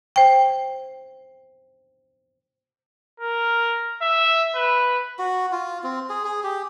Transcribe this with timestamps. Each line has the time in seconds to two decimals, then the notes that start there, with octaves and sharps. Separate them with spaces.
0.16 C5 G5
3.20 A#4
4.02 E5
4.55 B4
5.19 F#4
5.52 F4
5.83 C4
6.09 G#4
6.25 G#4
6.44 G4